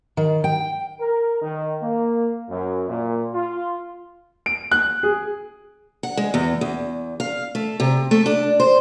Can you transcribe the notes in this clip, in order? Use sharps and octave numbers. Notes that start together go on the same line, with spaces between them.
D#3
G5
A#4
D#3
A#3
F#2
A#2
F4
D7
F#6
G#4
F#5
G#3
E2
E2
F5
A3
C3
A3
D4
C5